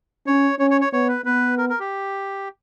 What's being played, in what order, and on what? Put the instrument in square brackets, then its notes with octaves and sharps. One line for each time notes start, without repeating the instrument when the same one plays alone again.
[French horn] C#4 [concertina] C#5
[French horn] C#4 [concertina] C#5
[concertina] C#5
C#5
[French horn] B3 [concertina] C#5
[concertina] B4
[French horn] B3 [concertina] B4
[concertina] A#4
A#4
G4